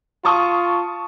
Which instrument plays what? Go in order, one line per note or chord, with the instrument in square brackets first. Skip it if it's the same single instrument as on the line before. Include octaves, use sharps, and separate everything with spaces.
[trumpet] F4 [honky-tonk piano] A5 C#6 D#6